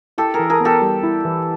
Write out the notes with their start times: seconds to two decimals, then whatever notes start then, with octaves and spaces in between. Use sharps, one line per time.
0.18 E4 G4 A4
0.34 G#4 A#4
0.39 E3
0.50 G#4 A#4
0.60 B3 G4 A4
0.81 G3
1.03 E4
1.25 E3